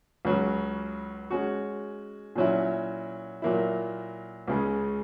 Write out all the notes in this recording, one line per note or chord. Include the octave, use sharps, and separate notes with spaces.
C#2 C#3 F#3
G#3 C#4 F#4
A#2 F#3 C#4 E4
A#2 F#3 A#3 E4
C#2 C#3 G#3